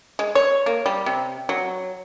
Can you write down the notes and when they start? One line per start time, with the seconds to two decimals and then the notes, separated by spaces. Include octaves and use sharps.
0.19 G#3
0.35 C#5
0.66 A#3
0.86 G3
1.06 C3
1.49 F#3